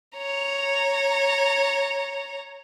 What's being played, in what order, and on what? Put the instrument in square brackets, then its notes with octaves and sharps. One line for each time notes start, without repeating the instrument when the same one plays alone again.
[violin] C#5 A#5